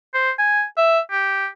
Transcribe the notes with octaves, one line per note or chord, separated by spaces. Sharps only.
C5
G#5
E5
G4